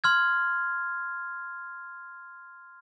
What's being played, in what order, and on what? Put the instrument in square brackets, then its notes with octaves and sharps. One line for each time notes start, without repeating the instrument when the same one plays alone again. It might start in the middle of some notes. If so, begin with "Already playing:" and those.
[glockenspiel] C6 F6 G#6